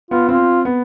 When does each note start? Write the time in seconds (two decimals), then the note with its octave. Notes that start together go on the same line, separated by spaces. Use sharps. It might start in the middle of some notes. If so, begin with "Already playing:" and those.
0.11 B3 F4
0.29 C4 F4
0.65 B3